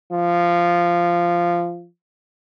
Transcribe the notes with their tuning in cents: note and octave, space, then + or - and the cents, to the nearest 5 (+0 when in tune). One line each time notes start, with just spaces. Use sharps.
F3 -10